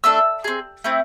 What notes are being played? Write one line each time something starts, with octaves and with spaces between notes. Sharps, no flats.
A3 D4 A4 E6
C4 G#4
A3 C4 E4